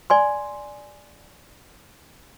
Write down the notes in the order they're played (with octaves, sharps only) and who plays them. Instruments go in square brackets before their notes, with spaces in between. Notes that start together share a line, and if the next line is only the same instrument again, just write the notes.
[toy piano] D5 G#5 C6